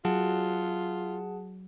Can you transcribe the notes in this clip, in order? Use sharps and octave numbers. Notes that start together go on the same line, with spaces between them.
F#3 F4 G#4 F#5 A5